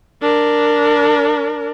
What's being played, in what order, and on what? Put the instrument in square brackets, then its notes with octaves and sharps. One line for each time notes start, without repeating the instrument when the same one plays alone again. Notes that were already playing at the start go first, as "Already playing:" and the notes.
[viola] D4 A#4